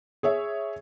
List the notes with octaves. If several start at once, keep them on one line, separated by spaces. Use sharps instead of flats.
G#4 C#5 E5